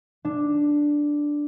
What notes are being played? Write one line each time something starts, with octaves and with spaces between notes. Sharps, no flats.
D4